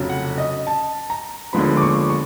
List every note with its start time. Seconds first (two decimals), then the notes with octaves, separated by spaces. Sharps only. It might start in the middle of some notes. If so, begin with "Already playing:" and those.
Already playing: F1 F2 C#3 F#3
0.09 F#5
0.38 D#5
0.67 A5
1.10 A#5
1.53 D#2 D3 F3 G#3 B3 B5
1.77 D6
1.82 C#6
2.10 C#6